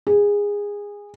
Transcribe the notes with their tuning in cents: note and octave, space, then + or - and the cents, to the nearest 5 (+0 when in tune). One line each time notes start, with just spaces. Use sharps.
G#4 -20